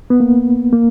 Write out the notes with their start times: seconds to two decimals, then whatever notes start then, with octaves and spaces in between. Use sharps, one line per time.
0.10 B3
0.20 A#3
0.73 A#3